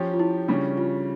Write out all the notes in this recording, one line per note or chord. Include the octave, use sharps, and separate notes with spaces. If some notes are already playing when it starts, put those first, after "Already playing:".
Already playing: F3 C#4 G4
F4
E4
C#3 G3 C#4 D4
F4